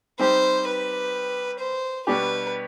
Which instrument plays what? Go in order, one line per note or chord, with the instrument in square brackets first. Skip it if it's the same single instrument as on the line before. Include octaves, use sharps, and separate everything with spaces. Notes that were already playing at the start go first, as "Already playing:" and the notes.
[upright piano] G3 C4 D#4 G4 [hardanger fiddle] C5
[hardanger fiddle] B4
C5
[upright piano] B2 G3 D4 G4 [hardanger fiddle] B4